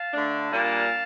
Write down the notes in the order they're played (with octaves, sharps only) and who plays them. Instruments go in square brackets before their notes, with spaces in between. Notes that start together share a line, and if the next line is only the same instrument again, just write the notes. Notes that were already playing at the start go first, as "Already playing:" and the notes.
Already playing: [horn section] F5 A5
D3 A3 D4
A#2 G3 A#3 D4 F5 A5